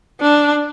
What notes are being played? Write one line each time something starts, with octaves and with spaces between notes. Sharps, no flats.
D4